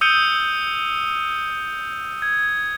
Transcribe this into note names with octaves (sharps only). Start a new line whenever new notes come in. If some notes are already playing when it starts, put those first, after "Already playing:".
D#6 E6 G6 C#7 D#7 G7
G#6